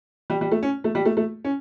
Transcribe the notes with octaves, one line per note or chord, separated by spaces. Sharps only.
G3
G3
A3
C#4
A3
G3
A3
A3
C#4